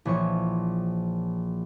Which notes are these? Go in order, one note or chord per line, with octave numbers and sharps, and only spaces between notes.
A#1 E3 F3 C#5 C#6